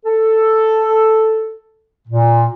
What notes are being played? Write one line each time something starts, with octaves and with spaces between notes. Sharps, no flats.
A4
A#2